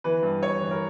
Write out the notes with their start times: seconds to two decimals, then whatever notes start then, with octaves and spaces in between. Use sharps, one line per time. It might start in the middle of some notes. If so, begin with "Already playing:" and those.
0.04 E3 B4
0.23 G2
0.41 G2 C#5
0.61 E3
0.71 A#4